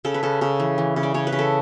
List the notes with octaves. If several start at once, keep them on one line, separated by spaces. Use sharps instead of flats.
C#3 A4
B4
C#3 A4
C#3
E3
E3
C#3
D5
C#3 C#5
B4
C#3
A4